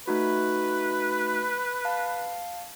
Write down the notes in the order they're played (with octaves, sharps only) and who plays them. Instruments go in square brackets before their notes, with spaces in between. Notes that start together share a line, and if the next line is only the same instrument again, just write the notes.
[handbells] A3 D#4 F#4 [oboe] B4
[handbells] F5 A5